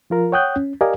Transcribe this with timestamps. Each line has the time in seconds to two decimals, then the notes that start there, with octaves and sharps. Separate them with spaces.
0.10 F3 F4 A#4
0.32 C#5 F#5 G5 D#6 F#6 G6
0.56 C#4
0.81 G4 A#4 D5 D#5 F5 G#5